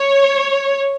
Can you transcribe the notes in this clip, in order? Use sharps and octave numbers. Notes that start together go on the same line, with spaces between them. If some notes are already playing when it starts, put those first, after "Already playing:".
Already playing: C#5